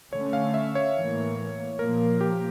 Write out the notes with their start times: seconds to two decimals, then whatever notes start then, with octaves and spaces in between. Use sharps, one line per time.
0.12 D3 A3 C#4 C#5
0.33 F5
0.54 E5
0.75 C#5
0.95 A2 E3 A#3
1.79 A#2 F3 A#3 A#4
2.21 G4